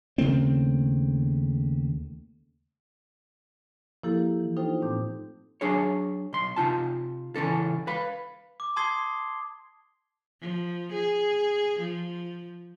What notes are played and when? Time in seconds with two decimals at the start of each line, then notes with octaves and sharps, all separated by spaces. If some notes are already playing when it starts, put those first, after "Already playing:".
0.18 D#2 C#3 A3 C4
4.04 F3 A#3 E4 G4 A4 A#4
4.40 E3
4.57 D4 D#4 F4 A4 C5 G5
4.82 A2 A3 C4 D#4 D6 G6
5.61 F#3 D4 G#4 C#5
6.33 B1 C6
6.56 C3 D#4 F4 A5
7.36 C#2 E3 C#4 A4
7.87 B4 F5 B5
8.60 D6
8.76 A5 C6 D#6 G#6 C7 G7
10.41 F3
10.92 G#4
11.79 F3